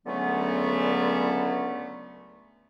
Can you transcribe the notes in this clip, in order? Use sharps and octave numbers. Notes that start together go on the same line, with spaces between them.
C#2 D3 F#3 A3 B3 C#4